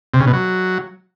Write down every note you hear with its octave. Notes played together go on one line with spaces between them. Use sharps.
C3
C#3
B2
F#3